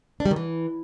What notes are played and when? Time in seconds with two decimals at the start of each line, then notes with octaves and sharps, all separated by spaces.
0.20 D4
0.26 G3
0.31 D#3
0.36 E3